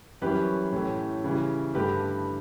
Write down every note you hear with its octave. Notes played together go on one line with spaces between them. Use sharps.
F#2 E3 G3 C#4 G4 B4
A2 E3 A3 C#4
C#3 E3 G3
G2 D3 A3 G4 B4